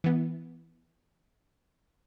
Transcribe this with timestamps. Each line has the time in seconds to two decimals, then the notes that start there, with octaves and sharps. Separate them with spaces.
0.04 E3 B3